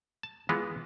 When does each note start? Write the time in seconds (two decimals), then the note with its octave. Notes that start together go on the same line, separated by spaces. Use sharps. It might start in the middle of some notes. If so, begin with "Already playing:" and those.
0.23 A5
0.49 E3 G#3 B3 F4